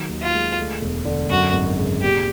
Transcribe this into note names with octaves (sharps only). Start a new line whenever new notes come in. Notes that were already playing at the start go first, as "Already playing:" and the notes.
Already playing: D#3 F#3
D#2
F4
G#3
D2
E1
D3
F#2 F#4
G#1
C#3
A#2 G4